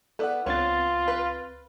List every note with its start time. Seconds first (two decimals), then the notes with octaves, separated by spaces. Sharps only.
0.19 B3 E4 A4 D5 F#5
0.46 C#2 B3 C4 D4 F4 C#5 A6
1.08 B4